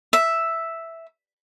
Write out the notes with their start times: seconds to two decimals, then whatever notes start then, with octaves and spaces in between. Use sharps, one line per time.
0.13 E5